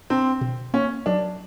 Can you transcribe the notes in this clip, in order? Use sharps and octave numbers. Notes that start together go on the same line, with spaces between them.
C4 D4
B2
A#3 C#4
F#3 D4